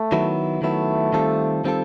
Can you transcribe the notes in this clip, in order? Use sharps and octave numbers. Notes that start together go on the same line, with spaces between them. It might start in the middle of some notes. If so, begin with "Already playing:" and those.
Already playing: A3
D#3 F#3 B3 E4
D#3 F#3 A3 B3 E4
D#3 G3 C4 F4 A4
D#3 G3 C4 F4 A4